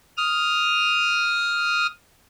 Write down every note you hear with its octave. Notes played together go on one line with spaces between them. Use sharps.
D#6 F6